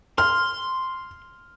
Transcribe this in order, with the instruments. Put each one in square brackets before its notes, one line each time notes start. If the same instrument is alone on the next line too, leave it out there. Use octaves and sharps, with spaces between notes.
[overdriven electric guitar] C6 [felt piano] F6